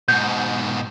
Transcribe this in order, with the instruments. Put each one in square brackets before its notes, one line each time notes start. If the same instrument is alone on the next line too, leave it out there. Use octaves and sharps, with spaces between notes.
[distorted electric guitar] G#2 B2 [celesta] G6